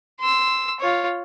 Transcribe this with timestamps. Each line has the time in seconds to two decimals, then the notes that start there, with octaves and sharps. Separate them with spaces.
0.20 C6 E6
0.80 F4 C#5